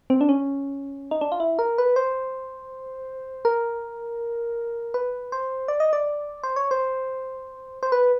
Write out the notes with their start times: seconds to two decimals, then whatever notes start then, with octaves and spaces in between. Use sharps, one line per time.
0.10 C4
0.21 D4
0.29 C#4
1.11 D#4
1.21 D4
1.32 F4
1.40 E4
1.59 A#4
1.78 B4
1.96 C5
3.45 A#4
4.94 B4
5.32 C5
5.68 D5
5.80 D#5
5.93 D5
6.44 C5
6.56 C#5
6.71 C5
7.83 C5
7.92 B4